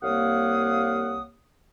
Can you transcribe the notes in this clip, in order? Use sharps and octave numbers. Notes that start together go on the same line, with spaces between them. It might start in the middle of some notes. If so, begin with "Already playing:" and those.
C2 A#3 C#5 F5 F#5 D#6